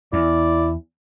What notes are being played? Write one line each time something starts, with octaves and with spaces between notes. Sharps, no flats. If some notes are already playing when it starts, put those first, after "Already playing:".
E2 E4 D5